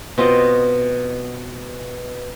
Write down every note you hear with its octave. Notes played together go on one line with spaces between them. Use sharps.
B2 C4 F4 D#5